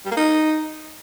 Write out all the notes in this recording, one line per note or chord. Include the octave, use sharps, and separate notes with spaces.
G3
A#3
D#4